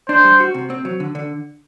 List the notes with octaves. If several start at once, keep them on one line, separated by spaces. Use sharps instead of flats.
D4 C5
G3
F#4
C3
C4
F#3
D3
D3